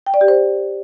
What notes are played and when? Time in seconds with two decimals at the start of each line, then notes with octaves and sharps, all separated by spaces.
0.07 G5
0.14 D5
0.21 G4
0.28 C5